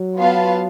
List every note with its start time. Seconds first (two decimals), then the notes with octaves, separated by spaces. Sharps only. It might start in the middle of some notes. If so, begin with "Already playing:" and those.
Already playing: F#3
0.17 B3 F4 B4 F5 A5